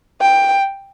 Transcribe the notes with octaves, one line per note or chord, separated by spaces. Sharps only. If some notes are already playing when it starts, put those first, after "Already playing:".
G5